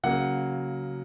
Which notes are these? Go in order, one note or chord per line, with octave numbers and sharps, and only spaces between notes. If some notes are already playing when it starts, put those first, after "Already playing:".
C#3 F#3 A#3 F#5